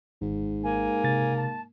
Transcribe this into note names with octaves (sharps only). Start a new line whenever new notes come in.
G#1 G#2
A#3 G#5
C3 A6
A5